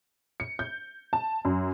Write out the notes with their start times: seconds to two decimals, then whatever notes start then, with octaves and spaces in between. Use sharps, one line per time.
0.40 C#7
0.59 G6
1.13 A5
1.45 F#2